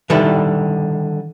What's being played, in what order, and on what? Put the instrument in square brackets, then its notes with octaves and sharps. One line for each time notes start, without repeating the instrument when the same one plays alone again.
[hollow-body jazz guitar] D3 D#3 G3 E4 A4 B4